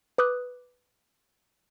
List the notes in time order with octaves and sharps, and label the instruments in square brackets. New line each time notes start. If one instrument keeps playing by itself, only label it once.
[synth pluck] B4 D6 D#6 F#6